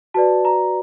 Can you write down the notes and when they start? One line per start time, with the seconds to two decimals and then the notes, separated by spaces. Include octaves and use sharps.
0.14 F#4 B4 D5 A5
0.45 A#5